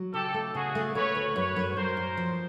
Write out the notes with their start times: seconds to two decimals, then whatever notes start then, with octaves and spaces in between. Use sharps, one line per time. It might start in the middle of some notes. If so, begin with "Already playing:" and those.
Already playing: F#3
0.13 C#3 G4 A4
0.34 A3
0.54 C#3 F#4 G#4
0.75 A3
0.95 A3 B4 C#5
1.15 D2
1.36 F#2 B4 C#5
1.56 F#2
1.76 F#2 A#4 C5
1.97 F#2
2.17 F3